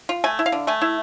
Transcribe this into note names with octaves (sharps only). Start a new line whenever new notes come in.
F4
A3 G#5
E4
F5
D3
A3 G#5
E4